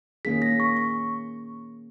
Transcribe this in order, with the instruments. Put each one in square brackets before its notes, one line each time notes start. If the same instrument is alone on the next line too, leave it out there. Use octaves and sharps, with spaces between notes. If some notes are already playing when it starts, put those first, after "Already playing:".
[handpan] D#3 A#3 C#4 G#4 [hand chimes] B6
[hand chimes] A#6
C#6
C#6